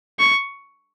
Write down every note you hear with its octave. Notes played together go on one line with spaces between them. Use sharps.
C#6